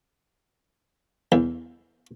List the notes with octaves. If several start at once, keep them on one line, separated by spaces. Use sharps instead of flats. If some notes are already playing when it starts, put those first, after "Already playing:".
E2